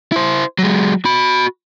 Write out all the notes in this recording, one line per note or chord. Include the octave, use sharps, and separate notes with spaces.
E4 C5
F#3 G#3
F#4 B5